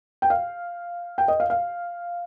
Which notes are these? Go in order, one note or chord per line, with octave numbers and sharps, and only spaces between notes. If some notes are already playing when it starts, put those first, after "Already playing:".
G5
F5
G5
D#5
F5
F5